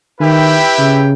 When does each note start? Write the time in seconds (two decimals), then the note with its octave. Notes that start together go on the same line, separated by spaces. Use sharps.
0.20 D#3 E4 G4 B4 E5 G5
0.78 C#3